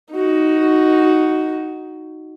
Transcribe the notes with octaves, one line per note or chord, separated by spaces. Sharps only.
D#4 F#4